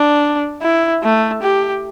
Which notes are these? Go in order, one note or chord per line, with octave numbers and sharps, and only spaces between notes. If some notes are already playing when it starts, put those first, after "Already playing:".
Already playing: D4
E4
A3
G4